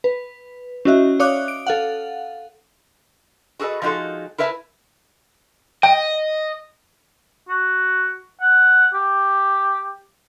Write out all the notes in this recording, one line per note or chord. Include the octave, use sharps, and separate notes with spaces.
B4
C#4 E4 F#4 D#5 E5
C#5 D5 F5 D6 D#6 F#6
D7
A4 F5 F#5
F#4 G#4 A4 B4 D#5
F3 G#3 D#4 F#4 G#4 A4
E4 A#4 B4 E5 A5
D#5 G5
F#4
F#5
G4